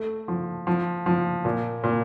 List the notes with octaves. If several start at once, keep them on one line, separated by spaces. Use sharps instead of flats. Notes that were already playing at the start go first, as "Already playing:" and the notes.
Already playing: A3
F3
F3
F3
A#2
A#2